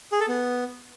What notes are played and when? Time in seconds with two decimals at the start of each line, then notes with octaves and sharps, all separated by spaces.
0.12 G#4
0.20 A4
0.28 B3